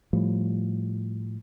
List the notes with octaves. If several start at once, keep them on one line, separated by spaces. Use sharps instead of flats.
A2 F3 G3